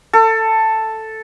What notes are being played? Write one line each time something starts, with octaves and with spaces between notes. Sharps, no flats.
A4